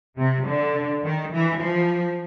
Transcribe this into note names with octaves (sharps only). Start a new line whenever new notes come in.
C3
D3
D#3
E3
F3